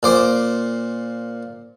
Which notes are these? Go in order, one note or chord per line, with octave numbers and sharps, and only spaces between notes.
A#2 C5 D6